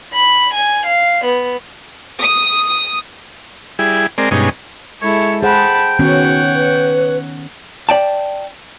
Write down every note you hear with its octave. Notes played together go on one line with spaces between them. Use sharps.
B5
G#5
F5
B3
D#6
G3 E4 G#4
G#3 C4 A#4 D5
G2 B2 G#3 C#4 D#4
G#3 E4 A4 C#5
G#4 C5 F#5 G5 A5 B5
D#3 B3 C#4 F#4 C#5 F#5
B4
D5 G5 A5